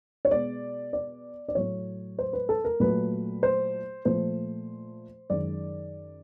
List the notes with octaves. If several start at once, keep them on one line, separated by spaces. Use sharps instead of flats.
C#5
B2 G#3 D5
D5
D5
A2 F#3 A3 C#5
C5
B4
A4
A#4
A#2 F#3 A3 B4
C5
A#2 F3 A3 C5
F#2 D#3 G#3 D5